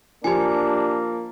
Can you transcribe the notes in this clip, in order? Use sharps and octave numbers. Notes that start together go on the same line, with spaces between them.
F3 A#3 D4 G4 G#5